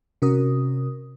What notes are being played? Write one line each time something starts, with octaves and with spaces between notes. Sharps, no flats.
C3 C#4 F#4 A#4 D#6